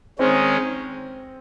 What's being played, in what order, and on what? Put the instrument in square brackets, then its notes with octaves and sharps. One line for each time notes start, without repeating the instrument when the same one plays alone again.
[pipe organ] D#3 G#3 C#4 [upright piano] C4